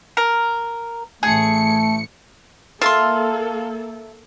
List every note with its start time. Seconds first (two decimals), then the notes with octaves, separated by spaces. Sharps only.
0.17 A#4
1.23 A1 A3 G#4 C#7
2.81 A#3 F4 A4 E5 A5 C6